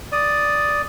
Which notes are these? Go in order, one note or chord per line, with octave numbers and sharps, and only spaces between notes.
D5 D#6